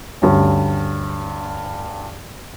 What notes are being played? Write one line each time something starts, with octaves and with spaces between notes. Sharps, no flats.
D2 G2 C#4